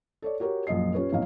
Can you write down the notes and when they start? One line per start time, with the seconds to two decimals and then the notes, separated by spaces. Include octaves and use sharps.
0.22 A4 C#5 D5
0.40 F#4 G4 A#4 C#5
0.67 A#1 F#2 A#2 D#5 C7
0.94 C#4 F4 G4 B4 C#5
1.12 B1 F2 A2 D#4 C#5 F5